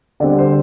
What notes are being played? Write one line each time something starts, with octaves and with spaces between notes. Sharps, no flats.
D3 G3 C4 D5
C5